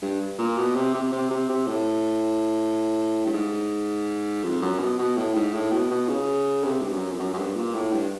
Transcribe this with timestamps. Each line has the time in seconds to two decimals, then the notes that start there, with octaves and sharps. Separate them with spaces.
0.02 G2
0.39 A#2
0.57 B2
0.75 C3
0.94 C3
1.12 C3
1.30 C3
1.49 C3
1.67 A2
3.26 G2
3.33 G#2
4.43 F2
4.62 F#2
4.80 B2
4.99 B2
5.17 A2
5.35 G#2
5.54 A2
5.72 B2
5.91 B2
6.09 C#3
6.64 C3
6.82 G2
6.92 F#2
7.11 F2
7.19 F#2
7.34 F#2
7.38 G2
7.56 A#2
7.74 A2
7.93 G2